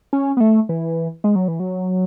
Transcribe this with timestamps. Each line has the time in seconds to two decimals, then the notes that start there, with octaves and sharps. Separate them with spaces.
0.13 C#4
0.37 B3
0.40 A3
0.69 E3
1.24 G#3
1.35 F#3
1.48 E3
1.60 F#3